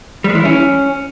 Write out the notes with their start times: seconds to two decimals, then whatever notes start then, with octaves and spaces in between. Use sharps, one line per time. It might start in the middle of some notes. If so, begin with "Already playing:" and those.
0.24 G3
0.30 G#3
0.35 E3
0.40 E4
0.45 C#4